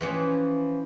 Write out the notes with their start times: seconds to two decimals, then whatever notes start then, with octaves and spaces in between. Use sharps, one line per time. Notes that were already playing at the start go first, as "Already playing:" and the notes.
0.01 E3 F3 C#4